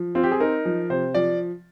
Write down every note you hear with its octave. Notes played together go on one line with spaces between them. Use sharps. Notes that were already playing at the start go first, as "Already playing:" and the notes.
Already playing: F3
C4 F4
G4
G#4
D#4 A#4
F3
C3 C5
F3 D5